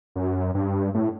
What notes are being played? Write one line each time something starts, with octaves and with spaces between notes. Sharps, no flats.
F#2
G2
A2